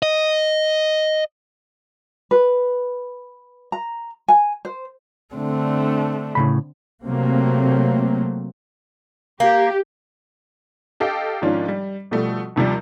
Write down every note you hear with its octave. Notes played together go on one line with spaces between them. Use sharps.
D#5
B4
A#5
G#5
C5
D3 A3 C4 D4
A2 C#3 B5
C3 F#3 A3 A#3 C4
A#3 G4
G4 A4 D#5 F5 G5
G#2 D#3 F3 C#4 D4 F4
G3
B2 F3 G3 A3
D#2 C3 F3 G3